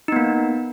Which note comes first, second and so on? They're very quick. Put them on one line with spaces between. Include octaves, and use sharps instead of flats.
D#4 B3 A#3